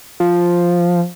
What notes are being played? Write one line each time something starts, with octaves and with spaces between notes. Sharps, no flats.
F3